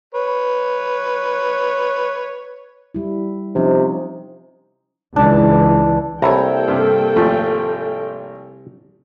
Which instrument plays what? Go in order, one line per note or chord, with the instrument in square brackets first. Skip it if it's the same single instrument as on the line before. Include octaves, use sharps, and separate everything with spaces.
[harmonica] B4 C#5
[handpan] G3 E4
[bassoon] C3 [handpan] F3 C#4 D#4
[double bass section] C#2 E3 [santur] D4
[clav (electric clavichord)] C2 E4 A5 [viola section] A#3 A4 G5 [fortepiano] C#5 A#5
[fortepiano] G2 C3
G#1 F3 A3